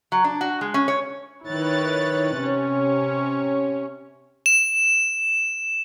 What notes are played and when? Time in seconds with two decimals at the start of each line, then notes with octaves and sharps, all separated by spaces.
0.12 F#3
0.24 D4
0.41 F#4
0.61 G#3
0.74 C#4
0.88 C#5
1.48 D#3 E4 B4 C#5 F#6 A6
2.40 C3 C#4 C#5
4.46 E7